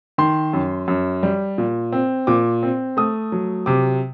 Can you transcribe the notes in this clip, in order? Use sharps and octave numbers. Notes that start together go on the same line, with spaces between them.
D#3 C6
F#2
F#2
G3
A#2
C4
A#2 D6
C4
A3 D#6
F#3
C3 D6